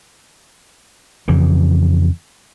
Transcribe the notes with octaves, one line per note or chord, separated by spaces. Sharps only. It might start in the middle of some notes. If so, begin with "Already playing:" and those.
F2 C#3 E3